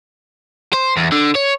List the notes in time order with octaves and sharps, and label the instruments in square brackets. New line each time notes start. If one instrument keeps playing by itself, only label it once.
[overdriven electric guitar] C5
E2
D3
C#5